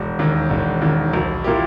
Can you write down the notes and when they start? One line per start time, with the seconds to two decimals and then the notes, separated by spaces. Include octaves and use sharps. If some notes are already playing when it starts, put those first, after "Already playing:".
Already playing: E1
0.19 D#2 D#3
0.50 E1
0.82 D#2 D#3
1.13 B1
1.44 A#2 A#3 E4 G4